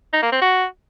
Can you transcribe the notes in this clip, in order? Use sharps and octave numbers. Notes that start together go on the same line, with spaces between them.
D#4
A#3
C4
F#4